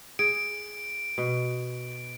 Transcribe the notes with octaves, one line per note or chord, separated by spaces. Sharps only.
G#4 D7
B2